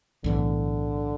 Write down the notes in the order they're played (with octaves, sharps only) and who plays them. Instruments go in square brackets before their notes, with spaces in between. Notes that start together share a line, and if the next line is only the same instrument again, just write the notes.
[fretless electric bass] B1 A2 E3 [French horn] D3